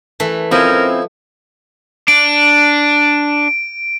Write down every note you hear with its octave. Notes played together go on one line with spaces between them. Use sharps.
E3 A3
F3 C4 C#4 E4 A#4 D#5
D4 D7